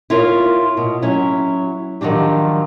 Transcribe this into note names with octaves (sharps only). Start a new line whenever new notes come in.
E4 F4 A#4 C#5
B2
F#3 C#4 E4
D#3 F3 F#3 D4 G4